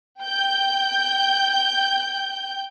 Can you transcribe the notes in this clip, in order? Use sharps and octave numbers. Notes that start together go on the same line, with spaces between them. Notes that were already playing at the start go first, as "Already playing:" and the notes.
G5 G6